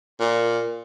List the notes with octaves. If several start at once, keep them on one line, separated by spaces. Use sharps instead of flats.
A#2